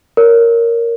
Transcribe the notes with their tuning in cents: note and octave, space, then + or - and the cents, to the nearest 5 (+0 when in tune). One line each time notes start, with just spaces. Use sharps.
A#4 -5 C#5 +25